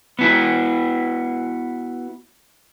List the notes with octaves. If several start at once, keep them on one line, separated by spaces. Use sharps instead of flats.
B3 E4 F#4